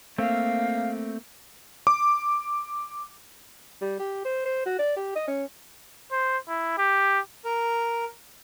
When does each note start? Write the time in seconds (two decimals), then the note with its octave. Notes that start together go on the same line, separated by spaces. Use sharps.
0.18 A3 A#3 C4 F5
1.87 D6
3.82 G3
3.99 G4
4.25 C5
4.45 C5
4.66 F#4
4.79 D5
4.96 G4
5.15 D#5
5.28 C#4
6.12 C5
6.49 E4
6.78 G4
7.45 A#4